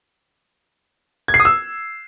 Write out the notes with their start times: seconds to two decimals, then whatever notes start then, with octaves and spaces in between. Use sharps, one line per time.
1.28 G#6
1.34 C7
1.40 D#6
1.45 E6